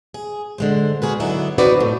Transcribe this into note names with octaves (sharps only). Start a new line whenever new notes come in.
G#4
D3 G#3 C5
F#4 G#4 A#4 B4
D3 F#3 B3 D#4 E4
C4 D#4 F#4 B4 D5
A2 A3